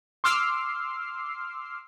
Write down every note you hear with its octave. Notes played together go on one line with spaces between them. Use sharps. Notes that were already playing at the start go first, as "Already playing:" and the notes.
C6 D6 E6 F6 C7